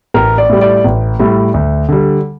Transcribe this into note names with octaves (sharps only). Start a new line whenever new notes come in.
A1 A#4
D5
A2 G3
D5
A1
A2 G3
D2
D3 G3